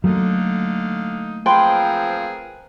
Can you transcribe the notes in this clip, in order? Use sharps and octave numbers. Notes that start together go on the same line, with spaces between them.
D3 F#3 A3 A#3 D#4 F5
F3 C4 G#4 A#4 B4 G5 C6